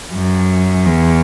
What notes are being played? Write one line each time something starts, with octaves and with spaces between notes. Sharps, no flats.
F#2
E2